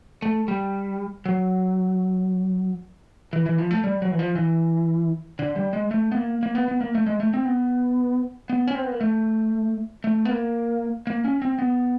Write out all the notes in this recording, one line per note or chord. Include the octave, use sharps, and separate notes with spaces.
A3
G3
F#3
E3
E3
F3
A3
G3
F#3
E3
F3
E3
D3
G3
G#3
A3
B3
A#3
A#3
B3
B3
A#3
A3
G#3
A3
C4
B3
B3
C#4
C4
B3
A#3
A3
A3
B3
A#3
A#3
C#4
C4
B3